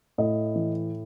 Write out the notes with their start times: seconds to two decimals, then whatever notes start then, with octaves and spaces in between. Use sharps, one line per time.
0.18 A2 D#5
0.55 E3